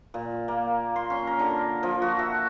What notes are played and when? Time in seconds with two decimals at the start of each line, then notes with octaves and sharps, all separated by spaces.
0.14 A#2
0.48 A#3
0.96 C6
1.10 C#4
1.27 A#4
1.39 D3
1.83 F3
2.02 F#4
2.19 E5